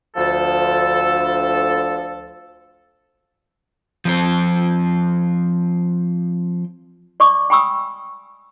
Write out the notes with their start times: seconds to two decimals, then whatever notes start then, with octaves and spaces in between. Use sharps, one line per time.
0.16 D2 F3 A4
4.05 F3 C4 C5
7.20 D5 C#6 D6
7.50 G5 G#5 B5 C#6 D#6 E6